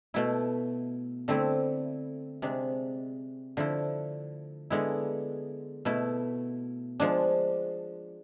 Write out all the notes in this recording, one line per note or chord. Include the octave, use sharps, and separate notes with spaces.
B2 A3 E4
D3 A3 C4 E4
C3 G#3 D4
D3 F3 A3 E4
D3 G#3 B3 E4
B2 A3 E4
F3 G#3 D4